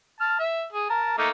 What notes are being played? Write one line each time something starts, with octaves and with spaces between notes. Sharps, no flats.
A5 F6
E5
G#4
A#4 A5
A3 A#3 D#4